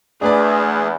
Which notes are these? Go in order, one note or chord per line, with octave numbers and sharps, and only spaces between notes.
E2 A3 D4 G#4 B4 D5